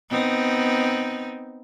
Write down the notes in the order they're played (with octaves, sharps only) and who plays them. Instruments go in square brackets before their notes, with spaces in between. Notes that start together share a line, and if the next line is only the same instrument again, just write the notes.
[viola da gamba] B3 C4 D#4